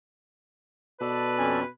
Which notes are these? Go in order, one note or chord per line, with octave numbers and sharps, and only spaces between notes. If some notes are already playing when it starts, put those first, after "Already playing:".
B2 A4 B4 D5 A5
F2 C#4 G#5